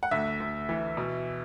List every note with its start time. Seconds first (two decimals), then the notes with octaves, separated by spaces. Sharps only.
0.03 F#5
0.11 D2 E5
0.40 D2
0.69 E3
0.97 B2